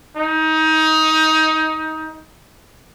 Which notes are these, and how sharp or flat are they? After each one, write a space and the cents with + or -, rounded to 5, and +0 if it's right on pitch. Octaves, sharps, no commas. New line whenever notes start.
D#4 +20